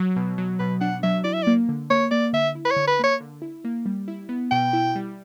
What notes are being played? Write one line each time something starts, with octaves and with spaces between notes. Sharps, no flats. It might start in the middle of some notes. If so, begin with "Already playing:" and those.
Already playing: F#3
B2
F#3
B2 B4
D4 F#5
F#3 E5
E4 D5
E5
A#3 D5
D3
A#3 C#5
A#3 D5
D3 E5
E4
B4
C#5
D3
B4
A#3 C#5
D3
E4
A#3
G3
E4
B3
B2 G5
E4
G3